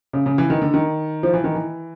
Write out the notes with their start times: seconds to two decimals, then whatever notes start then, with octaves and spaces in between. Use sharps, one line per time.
0.13 C#3
0.26 C#3
0.38 E3
0.50 D#3
0.62 D3
0.74 D#3
1.23 F3
1.34 E3
1.44 D#3
1.55 E3